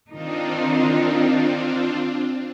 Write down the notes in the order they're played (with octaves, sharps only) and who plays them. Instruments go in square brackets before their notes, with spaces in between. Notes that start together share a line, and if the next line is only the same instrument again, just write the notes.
[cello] D#3 D#4 [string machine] C4 D4 F4